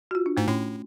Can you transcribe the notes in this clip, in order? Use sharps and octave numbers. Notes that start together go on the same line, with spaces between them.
F#4
F4
D4
G#2 A3
A2 C#4